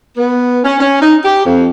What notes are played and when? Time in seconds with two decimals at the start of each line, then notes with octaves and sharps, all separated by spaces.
0.17 B3
0.64 C#4
0.80 C#4
1.01 D#4
1.24 G4
1.45 F2